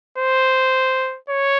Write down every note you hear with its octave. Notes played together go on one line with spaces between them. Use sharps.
C5
C#5